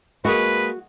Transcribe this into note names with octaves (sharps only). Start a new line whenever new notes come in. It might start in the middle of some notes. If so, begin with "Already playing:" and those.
G#3 A#3 F#4 G#4 B4